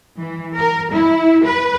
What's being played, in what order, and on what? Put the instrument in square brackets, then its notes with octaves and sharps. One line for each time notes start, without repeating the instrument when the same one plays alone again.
[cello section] E3
A#4
E4
B4